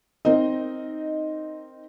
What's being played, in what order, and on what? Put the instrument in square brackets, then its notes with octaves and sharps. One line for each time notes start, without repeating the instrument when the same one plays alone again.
[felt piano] C4 D#4 A#4 D#5